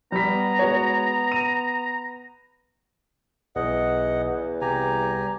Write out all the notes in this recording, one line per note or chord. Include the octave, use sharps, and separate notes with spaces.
G3 B3 A#5 B6
G#3 F#4 C#5
D#7
B1 E2 D#5 F#5
C2 G4 G#5 A#5